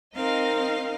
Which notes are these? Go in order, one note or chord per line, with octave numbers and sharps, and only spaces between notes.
C4 D#4 A#4 D#5 F5